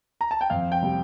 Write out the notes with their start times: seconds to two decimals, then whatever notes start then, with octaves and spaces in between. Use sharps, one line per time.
0.21 A#5
0.31 A5
0.41 G5
0.50 F2 F5
0.72 G5
0.81 C3 G3